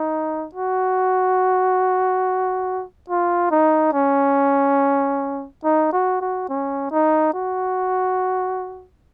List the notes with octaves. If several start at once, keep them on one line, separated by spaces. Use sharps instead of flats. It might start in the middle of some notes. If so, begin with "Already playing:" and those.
Already playing: D#4
F#4
F4
D#4
C#4
D#4
F#4
F#4
C#4
D#4
F#4